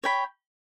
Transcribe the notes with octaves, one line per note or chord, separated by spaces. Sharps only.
C#5 G5 B5